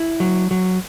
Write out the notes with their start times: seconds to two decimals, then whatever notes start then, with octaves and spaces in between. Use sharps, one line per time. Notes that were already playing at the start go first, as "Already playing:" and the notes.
Already playing: E4
0.20 F#3
0.51 F#3